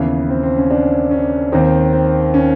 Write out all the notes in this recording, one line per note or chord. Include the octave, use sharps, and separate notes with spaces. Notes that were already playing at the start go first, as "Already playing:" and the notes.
Already playing: D#2 C#3 E3 B3
C4
C4
C#4
D4
C#4
D#2 D#3 C4
C4
C#4